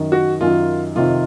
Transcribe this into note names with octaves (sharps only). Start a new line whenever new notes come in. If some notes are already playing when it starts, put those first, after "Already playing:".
Already playing: F#2 D#3
F#4
F#2 D#3 F4
F2 C3 D#3 F4